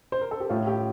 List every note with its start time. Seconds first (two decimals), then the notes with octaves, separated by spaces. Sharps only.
0.12 C5
0.21 A#4
0.31 A4
0.40 G4
0.49 A2 A3 F4
0.61 F4
0.67 G4